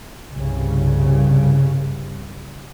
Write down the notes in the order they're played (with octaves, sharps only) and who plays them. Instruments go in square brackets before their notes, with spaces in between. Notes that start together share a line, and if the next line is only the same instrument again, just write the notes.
[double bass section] C2 G2 C#3